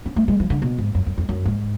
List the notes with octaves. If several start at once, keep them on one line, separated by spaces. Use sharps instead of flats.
C#4
A3
G#3
F3
D3
B2
G#2
F#2
F#2
F2
F#2
G#2